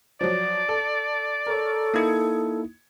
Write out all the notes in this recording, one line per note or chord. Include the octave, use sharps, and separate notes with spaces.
F3 F#3 D5
A4
A4 A#4 C#5
A#3 D#4 E4 D#6 G#6 C#7